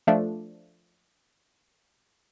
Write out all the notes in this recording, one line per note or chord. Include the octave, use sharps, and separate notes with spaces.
F3 A3 D4